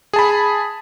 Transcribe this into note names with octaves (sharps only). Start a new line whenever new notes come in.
G#4 A5 B5